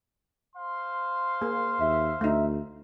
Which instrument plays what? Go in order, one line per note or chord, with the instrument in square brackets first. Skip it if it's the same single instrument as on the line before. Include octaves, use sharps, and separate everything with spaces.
[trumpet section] C5 F5 C6
[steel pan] A#3 G#4
[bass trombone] D#2 [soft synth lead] E5
[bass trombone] D2 [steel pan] A3 D#4